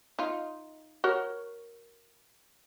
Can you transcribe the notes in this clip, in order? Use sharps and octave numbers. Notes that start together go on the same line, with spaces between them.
D#4 F4
F#4 A#4 C#5